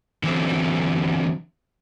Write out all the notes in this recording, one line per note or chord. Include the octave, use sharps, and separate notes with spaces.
D3 E3 F#3 B3 C4